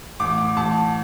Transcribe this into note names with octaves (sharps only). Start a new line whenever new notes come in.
A1 D6
D6
A1 A5